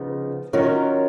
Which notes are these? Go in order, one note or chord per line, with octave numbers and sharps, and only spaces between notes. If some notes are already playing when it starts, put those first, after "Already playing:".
Already playing: C#3 F3 B3 D#4
D#3 F#3 C#4 F4 A#4